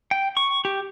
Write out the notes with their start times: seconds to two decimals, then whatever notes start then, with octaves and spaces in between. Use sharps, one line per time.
0.11 G5
0.37 C#6
0.65 G4